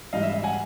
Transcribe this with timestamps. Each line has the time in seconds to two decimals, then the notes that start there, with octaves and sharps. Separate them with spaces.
0.13 G#2 E3 G3 D#5 F5
0.23 E5
0.33 E5
0.43 F#5 G#5